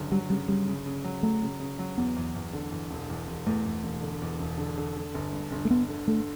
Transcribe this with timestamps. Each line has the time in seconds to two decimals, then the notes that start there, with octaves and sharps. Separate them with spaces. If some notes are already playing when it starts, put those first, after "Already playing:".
Already playing: G1 C#3 F#3
0.12 F#3 G3
0.30 C#3 G3
0.48 C#3 G3
0.68 C#3
0.86 C#3
1.04 F#3
1.23 F#3 A3
1.42 C#3
1.60 C#3
1.79 F#3
1.98 E2 B3
2.16 E2
2.35 E2
2.53 D3
2.72 E2
2.91 E1
3.10 E2
3.28 E1
3.46 E2 A3
3.65 E2
3.84 E1
4.02 D3
4.22 E2
4.40 E1
4.58 D3
4.78 D3
4.96 D3
5.14 G1
5.33 G2
5.52 G1
5.65 A3
5.70 G1 B3
5.89 D3
6.08 D3 A3